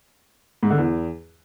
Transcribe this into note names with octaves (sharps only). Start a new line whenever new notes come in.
G#2
D3
E2